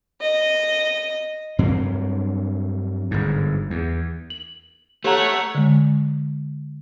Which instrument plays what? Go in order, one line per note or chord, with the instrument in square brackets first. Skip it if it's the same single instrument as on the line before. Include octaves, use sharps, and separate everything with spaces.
[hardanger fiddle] D#5
[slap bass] G2 F#3 C4
G1 G#2
E2
[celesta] F#7
[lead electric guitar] A3 [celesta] G4 A#5 [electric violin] C#5 F#5
[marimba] D3 G#3